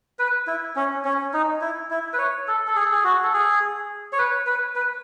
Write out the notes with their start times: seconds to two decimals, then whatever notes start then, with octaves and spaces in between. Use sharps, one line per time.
0.19 B4
0.47 E4
0.76 C#4
1.05 C#4
1.34 D#4
1.61 E4
1.90 E4
2.13 B4
2.18 C#5
2.48 A4
2.68 A4
2.76 G#4
2.92 G#4
3.04 F#4
3.23 A4
3.33 G#4
4.12 C#5
4.18 B4
4.46 B4
4.75 B4